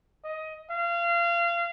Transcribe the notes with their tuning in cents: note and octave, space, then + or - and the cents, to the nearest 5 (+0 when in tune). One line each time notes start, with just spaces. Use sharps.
D#5 +15
F5 -30